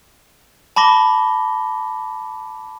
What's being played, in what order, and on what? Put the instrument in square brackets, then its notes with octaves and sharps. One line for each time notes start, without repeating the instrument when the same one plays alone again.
[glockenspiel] A5 B5 D6 A#6 G7